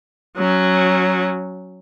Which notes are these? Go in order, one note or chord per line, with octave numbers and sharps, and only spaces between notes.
F#3 C#4